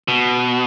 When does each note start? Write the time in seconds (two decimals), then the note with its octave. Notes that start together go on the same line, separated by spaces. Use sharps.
0.08 B2